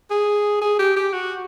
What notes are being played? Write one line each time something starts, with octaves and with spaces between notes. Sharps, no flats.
G#4
G#4
G4
G4
F#4